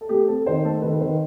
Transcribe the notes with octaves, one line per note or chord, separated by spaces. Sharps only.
A4
A3 G4
C4 A4
D#3 C5
A3 A4
D#3 B4
B4
D#3 C5